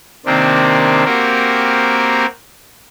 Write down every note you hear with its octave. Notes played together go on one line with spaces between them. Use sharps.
C3 D#3 A#3 C4 D4
A#3 C4 F#4 G4 A#4